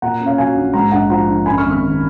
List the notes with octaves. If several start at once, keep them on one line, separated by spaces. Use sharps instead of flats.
A#2 F#5 A#5
C#4
C#5 F5
F#3 F5 G#5
A#1
G#2 F#5 A#5
A#1 F#5 A#5
F3 F#5 A#5
A#1
F#2 G#5 B5
C#6 F6
G#1
C#6 F6
D#3